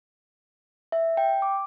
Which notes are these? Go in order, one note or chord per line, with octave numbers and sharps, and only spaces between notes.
E5
G5
D6